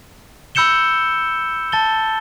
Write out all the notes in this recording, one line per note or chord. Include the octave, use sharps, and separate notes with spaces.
B5 E6 G6 C#7 E7 G7
A5 A6 G7